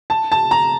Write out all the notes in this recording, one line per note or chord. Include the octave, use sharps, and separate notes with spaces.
A5
A5
A#5